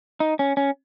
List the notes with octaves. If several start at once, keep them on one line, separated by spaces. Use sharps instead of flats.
D#4
C#4
C#4